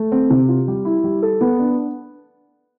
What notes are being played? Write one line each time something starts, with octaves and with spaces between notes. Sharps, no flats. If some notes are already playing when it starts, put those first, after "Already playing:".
Already playing: A3
C4
C3
F4
G3
E4
G3
A4
B3
D4